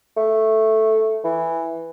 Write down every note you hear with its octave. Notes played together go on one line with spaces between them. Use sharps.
A3
E3